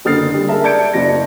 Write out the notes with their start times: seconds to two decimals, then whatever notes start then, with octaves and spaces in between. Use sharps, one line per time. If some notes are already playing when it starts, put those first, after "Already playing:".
0.05 F#1 D3 D#6 F6 A6 C7
0.34 G3
0.47 G#4 A#4 E5 A5
0.64 D5 A5 G6 G#6 C#7 D7
0.93 F#1 D5 A#6